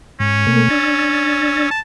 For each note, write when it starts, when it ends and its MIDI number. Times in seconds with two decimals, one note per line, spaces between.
0.20 0.46 44
0.20 1.66 61
0.47 0.69 47
0.47 0.69 57
0.47 0.69 58
0.70 1.70 62
0.70 1.70 88
0.70 1.70 93
1.71 1.80 81